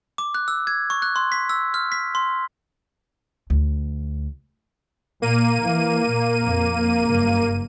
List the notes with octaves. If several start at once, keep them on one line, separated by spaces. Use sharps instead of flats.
D6
F#6
E6
G#6
C#6
F#6
C6
B6
E6
F6
B6
C6
D2
A#2 A#3 D#7
E3
A#2
F2
F#1 G2